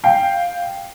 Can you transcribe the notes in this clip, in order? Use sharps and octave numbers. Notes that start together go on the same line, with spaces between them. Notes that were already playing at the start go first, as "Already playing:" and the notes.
F5 G5 C7